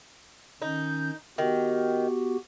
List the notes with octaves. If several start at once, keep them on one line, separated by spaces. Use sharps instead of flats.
D#3 C#4 D#4 G6
D#3 B3 F#4 G4